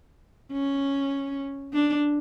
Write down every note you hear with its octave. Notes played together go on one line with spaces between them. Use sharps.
C#4
D4